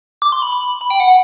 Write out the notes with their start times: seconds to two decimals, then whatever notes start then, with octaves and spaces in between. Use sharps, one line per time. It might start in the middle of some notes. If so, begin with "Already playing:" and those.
0.22 D6
0.32 C6
0.42 B5
0.52 B5
0.81 B5
0.90 G5
1.00 F#5